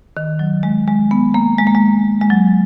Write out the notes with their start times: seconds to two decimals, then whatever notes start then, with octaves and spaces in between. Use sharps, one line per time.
0.17 D#3
0.39 F#3
0.63 G#3
0.88 G#3
1.11 B3
1.34 A#3
1.58 G#3
1.67 A#3
1.75 G#3
2.21 G#3
2.30 F#3